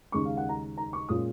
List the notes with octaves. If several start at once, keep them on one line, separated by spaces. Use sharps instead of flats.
D#2 C#3 G#3 D#4 C#6
F5
F#5
A#5
A#5
C#6
A#2 G#3 C#4 F4 D#6